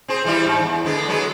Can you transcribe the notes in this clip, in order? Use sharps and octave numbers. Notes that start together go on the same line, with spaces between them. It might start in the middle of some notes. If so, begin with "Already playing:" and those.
C4 G#4 C5
E3 G3 E4
G#2
E2
D3 G#3 B3
F#3 G#3 B3